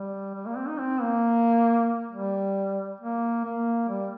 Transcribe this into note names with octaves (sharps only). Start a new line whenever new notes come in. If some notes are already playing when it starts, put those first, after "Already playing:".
Already playing: G3
G3
A#3
C4
D#4
C4
A#3
G3
A#3
A#3
G3